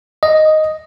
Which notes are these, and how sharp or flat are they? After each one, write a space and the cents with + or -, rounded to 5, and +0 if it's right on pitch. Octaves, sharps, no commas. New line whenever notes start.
D#5 +0